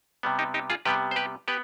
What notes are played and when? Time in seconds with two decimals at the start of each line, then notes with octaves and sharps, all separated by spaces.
0.23 C3 G3 B3
0.39 D#4 G4
0.54 D#4 G4
0.70 F4 G#4
0.85 C3 G3 B3 G4 B4
1.11 C5
1.16 G4 B4
1.48 B3 G4 B4